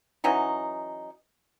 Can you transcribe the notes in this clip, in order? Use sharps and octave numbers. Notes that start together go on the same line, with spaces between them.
E3 F#3 C#4 D#4